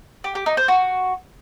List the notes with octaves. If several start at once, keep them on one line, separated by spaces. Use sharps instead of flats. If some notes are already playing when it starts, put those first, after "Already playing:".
G4
G4
D#4
C5
F#4